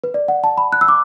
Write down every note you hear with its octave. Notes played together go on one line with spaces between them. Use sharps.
B4
D5
F#5
A5
B5
F#6
E6
D6